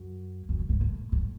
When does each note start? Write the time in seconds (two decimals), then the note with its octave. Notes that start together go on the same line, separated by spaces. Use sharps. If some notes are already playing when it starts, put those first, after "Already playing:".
Already playing: F#2
0.49 F#2
0.59 A2
0.69 G#2
0.81 A2
1.12 A2